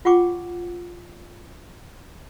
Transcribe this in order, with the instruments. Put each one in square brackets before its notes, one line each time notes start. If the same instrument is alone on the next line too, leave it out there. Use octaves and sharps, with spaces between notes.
[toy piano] F4 F#5 G5 C#6 D6